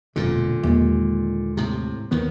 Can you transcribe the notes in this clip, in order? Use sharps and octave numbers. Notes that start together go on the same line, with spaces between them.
E1 F#2 A#2 D3
D#2 G#3
A2 C3
D#2 D#3 B3